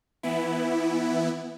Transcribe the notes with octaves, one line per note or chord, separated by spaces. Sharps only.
E3 B3 E4